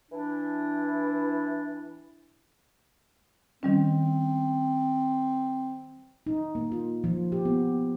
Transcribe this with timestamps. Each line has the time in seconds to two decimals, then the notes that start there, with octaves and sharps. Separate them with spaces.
0.10 E3 D4 E4
3.63 D#3 G3 C4 C#4
6.27 D#4
6.55 A#3
6.72 F4
7.04 F3
7.32 G4
7.45 B3